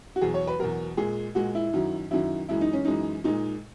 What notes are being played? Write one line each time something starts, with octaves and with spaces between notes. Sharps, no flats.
F#4
E2 B2 F#3 G#4
C#5
B4
E2 B2 F#3 A#4
A#2 G#3 G#4
A#2 G#3 F#4
E4
F#2 D#3 F#3
F#2 D#3 F#3 E4
F#2 E3 G#3 E4
D#4
C#4
F#2 E3 G#3 D#4
A#2 G#3 D#4